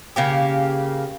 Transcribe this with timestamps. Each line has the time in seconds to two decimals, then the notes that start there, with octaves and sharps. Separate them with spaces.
0.16 C#3 A#3 G4